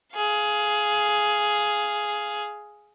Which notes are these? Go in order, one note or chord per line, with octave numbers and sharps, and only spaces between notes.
G#4 F5